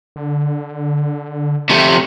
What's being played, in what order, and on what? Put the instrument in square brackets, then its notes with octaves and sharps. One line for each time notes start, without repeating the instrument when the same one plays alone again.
[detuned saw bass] D3
[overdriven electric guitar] C3 A3 [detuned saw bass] F3